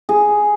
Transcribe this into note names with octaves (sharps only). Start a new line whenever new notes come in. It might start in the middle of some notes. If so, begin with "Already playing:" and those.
G#4